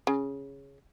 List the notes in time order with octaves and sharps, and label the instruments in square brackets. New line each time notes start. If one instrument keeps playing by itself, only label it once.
[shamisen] C#3